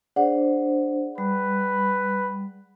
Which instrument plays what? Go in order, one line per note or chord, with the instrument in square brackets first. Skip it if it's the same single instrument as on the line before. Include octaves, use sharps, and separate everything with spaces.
[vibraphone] D4 C5 [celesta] G#4 D5 F#5
[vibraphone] G3 [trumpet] B4